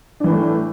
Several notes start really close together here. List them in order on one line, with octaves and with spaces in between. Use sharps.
D4 E3 A2 A3